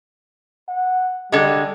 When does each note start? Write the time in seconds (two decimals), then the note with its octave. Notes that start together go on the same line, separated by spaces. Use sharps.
0.68 F#5
1.32 D3 G3 G#3